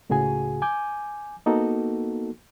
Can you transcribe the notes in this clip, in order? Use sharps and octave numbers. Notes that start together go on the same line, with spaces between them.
C#2 A2 C#3 F#4 G#4 G#5
G#5 D6 G6
A#3 B3 D#4 F#4 A4